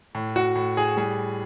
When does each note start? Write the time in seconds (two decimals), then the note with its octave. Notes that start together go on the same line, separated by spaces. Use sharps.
0.15 A2
0.36 F#4
0.56 A2
0.77 G#4
0.97 G3 G#4